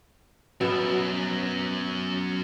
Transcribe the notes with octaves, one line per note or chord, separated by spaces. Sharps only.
F#2 B2 B3 E5